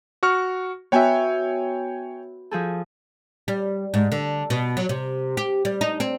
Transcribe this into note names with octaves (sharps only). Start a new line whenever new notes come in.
F#4 C#6 F6
B3 F#4 C#5 E5 G5 G#5
F3 G#4 A4
G3
G#2
D3
B2
F#3
C3
G4
G3
D#4
C4